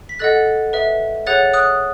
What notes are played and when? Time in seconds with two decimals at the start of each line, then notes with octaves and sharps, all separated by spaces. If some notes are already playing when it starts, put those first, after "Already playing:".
0.09 B6
0.19 A4 D#5 F#5 F#6 A6
0.73 B4 E5
1.27 G#4 C#5 F#5 F#6 A6
1.53 D#6 F#6